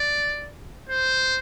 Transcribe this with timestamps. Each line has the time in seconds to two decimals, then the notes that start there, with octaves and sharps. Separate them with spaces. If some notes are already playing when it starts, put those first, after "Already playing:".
Already playing: D5
0.89 C5